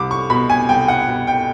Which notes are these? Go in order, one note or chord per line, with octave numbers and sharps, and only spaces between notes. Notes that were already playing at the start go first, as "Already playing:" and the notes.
Already playing: C2 D6
C#6
B2 B5
G#5
C2 G5
F#5
B2
G5